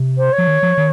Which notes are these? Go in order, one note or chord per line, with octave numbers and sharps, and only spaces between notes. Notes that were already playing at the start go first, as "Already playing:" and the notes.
Already playing: C3
C5
C#5
F3
D#3
F3
D#3